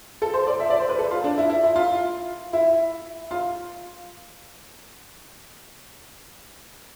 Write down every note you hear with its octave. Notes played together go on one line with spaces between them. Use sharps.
A4
C5
D5
E5
D5
C5
B4
A4
F4
D4
E4
E4
E4
F4
E4
F4